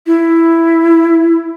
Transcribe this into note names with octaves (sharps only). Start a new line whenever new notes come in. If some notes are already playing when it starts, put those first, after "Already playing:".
E4